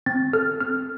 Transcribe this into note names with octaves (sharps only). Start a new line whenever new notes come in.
C4 A6
A4 F6
C4 F6